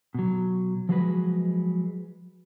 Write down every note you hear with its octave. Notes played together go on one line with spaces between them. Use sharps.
B2 F#3
F3 F#3 G#3 F#4 G#4 B4